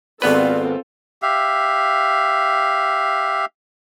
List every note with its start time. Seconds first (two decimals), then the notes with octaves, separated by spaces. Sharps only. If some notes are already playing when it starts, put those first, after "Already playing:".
0.22 G#1 B3 C4 F4 A4 B4 D5
1.22 G4 E5 F5